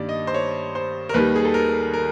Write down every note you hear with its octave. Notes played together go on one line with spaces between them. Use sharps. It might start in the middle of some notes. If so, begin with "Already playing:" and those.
Already playing: G2 D#3 G3 A#3 D5
D#5
C5
C#5
C5
A#4
D#2 D#3 G3 B4
G#4
A4
A#4
A#4